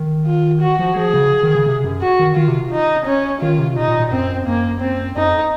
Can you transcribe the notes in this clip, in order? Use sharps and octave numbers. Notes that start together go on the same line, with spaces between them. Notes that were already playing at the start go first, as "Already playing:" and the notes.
Already playing: D#3
F4
F#4
F3
F3 G#4
C#3
D#3
C#3
C3
F#2
F#4
D#3
D#3 F4
C3
D#4
C#4
D#3 F4
C3
A#2 D#4
A#2
A#2
F#2 C4
F#2 A#3
C4
F#2 D#4
F2